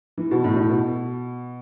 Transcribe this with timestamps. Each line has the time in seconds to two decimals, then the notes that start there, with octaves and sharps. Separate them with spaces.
0.18 E3
0.31 B2
0.44 A2
0.57 A2
0.69 B2